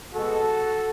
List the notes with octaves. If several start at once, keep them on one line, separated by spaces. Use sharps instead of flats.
B2 G#3 B3 F#4 A4